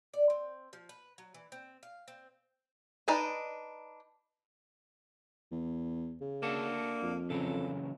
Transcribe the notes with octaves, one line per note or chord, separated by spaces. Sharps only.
D5
C4
F3
B4
F#3
E3
C4
F5
C4
D4 D#4 B4 D5 D#5
E2
C#3
A#3 D4 F#4 A4
F2
C#3 E3 F#3 A4